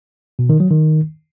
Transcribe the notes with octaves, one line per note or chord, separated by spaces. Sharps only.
B2
D#3
F#3
D#3